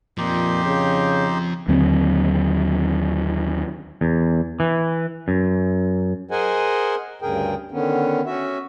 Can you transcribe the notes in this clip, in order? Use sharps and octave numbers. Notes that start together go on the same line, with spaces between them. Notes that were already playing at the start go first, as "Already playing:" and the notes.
A#2 F3 C4 D#4 G4 C6
C#3
D#2 D3 F#3 C4
E2
E3
F#2
G#4 A#4 C5 D#5 F#5 G#5
D2 G2 C#3 G#4 A#4 G5
D3 D#3 B3 C#4
C#4 F#4 E5